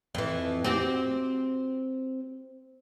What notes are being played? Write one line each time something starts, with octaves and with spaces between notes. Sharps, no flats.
F2 E3
C4 F#4 G4